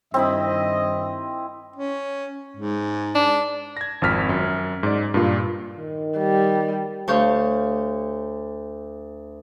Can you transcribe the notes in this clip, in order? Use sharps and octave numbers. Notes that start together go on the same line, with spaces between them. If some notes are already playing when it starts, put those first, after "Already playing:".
G2 D#3 C4 E4 D#5 B5
C#4
G#2
D4
G#6 A#6
G#1 F2 F6 B6
F#2
G#2 D5
G2 A#2 F4
D#3
G3
D2 G4 C#5 F5 C#6 G6